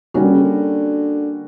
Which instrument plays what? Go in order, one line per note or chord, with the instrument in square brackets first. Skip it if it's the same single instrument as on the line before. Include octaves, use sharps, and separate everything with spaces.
[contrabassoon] D#3 [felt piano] G3 A#3 C#4 F#4
[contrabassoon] D3
C#3
D3